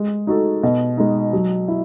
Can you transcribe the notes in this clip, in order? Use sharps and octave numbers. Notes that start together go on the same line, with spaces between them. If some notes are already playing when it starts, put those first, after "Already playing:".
Already playing: G#3
D#4 F#4 A4
B2
G#3 D#4
F#3
E4